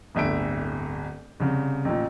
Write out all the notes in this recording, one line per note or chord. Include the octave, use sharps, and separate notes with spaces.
D1 G1 E5 D7
C2 C#3
A1 A#2